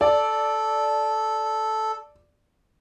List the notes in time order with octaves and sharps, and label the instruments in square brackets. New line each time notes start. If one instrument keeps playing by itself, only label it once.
[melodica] A4 [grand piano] D5